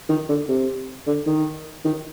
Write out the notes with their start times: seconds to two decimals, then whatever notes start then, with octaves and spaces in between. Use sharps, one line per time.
0.09 D#3
0.29 D3
0.49 C3
1.07 D3
1.26 D#3
1.85 D#3